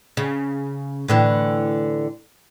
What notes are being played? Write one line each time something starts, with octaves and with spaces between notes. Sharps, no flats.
C#3
A2 D3 E3